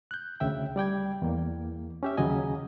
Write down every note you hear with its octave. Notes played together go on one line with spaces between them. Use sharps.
F#6 G6
D2 C#3 E5 G5
G3 D5 G5 G#6
E2 A#3
C#4 G4 E5
D#2 C#3 F#3 D#5 G#5